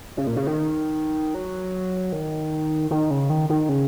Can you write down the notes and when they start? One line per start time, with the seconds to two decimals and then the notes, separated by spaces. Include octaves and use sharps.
0.17 C#3
0.27 A#2
0.36 C#3
0.47 D#3
1.35 F#3
2.12 D#3
2.91 D#3
3.11 C#3
3.30 D#3
3.49 D#3
3.69 C#3